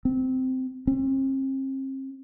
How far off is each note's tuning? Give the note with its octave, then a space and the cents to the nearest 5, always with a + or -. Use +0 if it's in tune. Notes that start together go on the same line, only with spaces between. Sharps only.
C4 -15
C4 +40